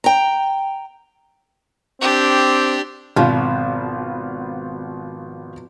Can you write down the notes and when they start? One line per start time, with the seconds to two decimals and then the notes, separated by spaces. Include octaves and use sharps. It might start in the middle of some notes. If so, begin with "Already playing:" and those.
0.04 G5 A#5
2.01 C4 D4 G4
3.16 G#1 B2 F3 F4